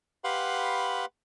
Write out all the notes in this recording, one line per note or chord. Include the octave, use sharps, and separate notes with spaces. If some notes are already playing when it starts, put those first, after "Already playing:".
G4 B4 F5 F#5 B5 C6